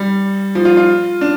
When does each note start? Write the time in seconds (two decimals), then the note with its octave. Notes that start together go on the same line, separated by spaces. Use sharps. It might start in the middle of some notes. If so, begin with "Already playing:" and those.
Already playing: G3
0.55 F3
0.65 F4
0.77 F4
1.21 D4